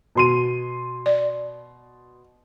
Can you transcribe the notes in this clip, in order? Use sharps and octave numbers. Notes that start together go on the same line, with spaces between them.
B2 C6 D#7
D5